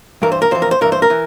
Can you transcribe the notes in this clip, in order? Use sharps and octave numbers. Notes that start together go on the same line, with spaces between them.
G2 E3 A#4
C5
A#4
F2 E3 C5
A#4
C5
G2 E3 A#4
C5
A#4
E3